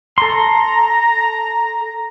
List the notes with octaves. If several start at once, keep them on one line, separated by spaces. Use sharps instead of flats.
A4 A#5 C6